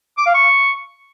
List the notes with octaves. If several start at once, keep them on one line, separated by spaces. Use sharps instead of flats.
D6
F5
C#6